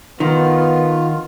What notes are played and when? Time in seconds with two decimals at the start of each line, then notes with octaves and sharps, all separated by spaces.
0.20 D#3 B3 F4